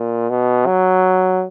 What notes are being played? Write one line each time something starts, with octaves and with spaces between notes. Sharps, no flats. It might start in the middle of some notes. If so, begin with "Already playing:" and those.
Already playing: A#2
B2
F#3